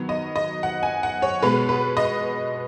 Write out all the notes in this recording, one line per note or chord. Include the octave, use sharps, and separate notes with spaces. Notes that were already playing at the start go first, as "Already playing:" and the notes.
Already playing: D#3 F#3 B3
D#5
D#5
F#5
G#5
F#5
C#5
B2 G#3 B3 B4
B4
D#5